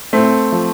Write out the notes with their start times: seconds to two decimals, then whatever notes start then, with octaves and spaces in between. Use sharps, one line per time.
0.13 A2 A3 C4
0.52 F3